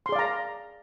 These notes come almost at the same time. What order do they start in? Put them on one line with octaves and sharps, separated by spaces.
C6 G#4 D5 F5 A#5